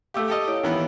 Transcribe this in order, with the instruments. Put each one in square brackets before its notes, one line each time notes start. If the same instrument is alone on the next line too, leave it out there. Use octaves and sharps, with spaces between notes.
[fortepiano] A3 G4 [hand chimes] F5 D6 E6
[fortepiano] G4 A4 D#5
[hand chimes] E4 C#5 D7
[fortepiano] D#3 E3 B3